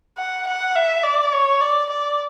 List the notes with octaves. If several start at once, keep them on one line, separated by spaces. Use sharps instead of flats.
F#5
F#5
E5
D5
C#5
D5
D5